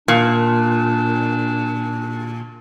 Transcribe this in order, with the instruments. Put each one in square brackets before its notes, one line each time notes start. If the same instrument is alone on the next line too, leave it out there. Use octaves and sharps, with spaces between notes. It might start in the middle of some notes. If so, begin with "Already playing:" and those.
[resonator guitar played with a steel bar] A#2 [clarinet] D4